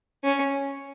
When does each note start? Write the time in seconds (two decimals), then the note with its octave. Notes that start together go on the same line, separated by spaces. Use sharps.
0.24 C#4